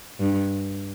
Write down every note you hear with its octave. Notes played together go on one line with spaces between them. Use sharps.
G2